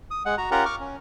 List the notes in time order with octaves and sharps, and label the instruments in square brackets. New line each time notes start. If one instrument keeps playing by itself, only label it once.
[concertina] D#6
G#3 F#5
F#4 A#5
C#4 F4 G4 A#4 F#5 A#5
C#6 D6 F6
C#4